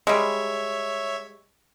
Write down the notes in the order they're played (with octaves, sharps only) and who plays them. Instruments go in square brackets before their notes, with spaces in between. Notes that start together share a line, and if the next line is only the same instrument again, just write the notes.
[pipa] G3 G#3 [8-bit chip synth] C#5 E5